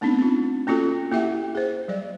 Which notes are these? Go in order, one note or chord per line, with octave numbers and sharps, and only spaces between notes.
A3 B3 C4 D4 D#4
C4 F4
A#3 C#4 F4 F#4 A4
A#3 E4 G4 E5 F#5 G5
G#4 C5
F#3 G3 D5